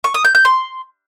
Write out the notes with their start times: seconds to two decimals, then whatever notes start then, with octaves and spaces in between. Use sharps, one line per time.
0.04 C#6
0.14 D#6
0.25 G6
0.35 G6
0.45 C6